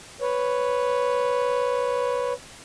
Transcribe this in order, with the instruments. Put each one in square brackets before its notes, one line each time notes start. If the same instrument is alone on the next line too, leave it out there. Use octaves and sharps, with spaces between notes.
[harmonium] B4 C#5